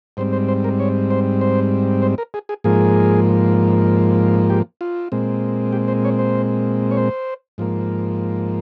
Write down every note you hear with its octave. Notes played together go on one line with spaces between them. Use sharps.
G#2 G3 C4 C5
C5
C5
A#4
C#5
C5
C5
C5
A#4
G#4
G#4
G#2 F3 A#3 G#4
G4
F4
A#2 G#3 C4
G4
C5
C#5
C5
C#5
C5
G#2 F3 A#3